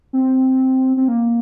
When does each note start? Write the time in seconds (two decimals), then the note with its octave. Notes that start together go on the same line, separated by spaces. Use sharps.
0.13 C4
0.97 C4
1.08 A#3